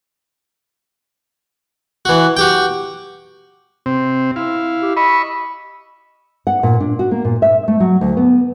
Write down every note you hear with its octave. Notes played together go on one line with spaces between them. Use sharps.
E3 F#4
F#4 G4 G5
C3 C4
E4 F5
G4
D#5 B5 C#6 E6
F#5
A#2
D4
F#4
A#3
A#2
E5
A3
F#3
D2
B3